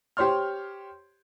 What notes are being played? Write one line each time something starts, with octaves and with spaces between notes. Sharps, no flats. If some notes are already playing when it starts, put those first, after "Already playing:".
G4 C5 C#5 C6 F6